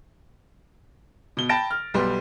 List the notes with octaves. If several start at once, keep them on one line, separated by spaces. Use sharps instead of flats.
B2 G7
G5 A5 B5 A6 A#6 D7
F6
B1 G3 B3 C6